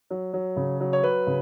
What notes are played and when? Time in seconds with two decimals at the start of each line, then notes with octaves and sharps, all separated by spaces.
0.10 F#3
0.33 F#3
0.56 C#3
0.81 F#3
0.93 C#5
1.03 F#3 B4
1.27 C#3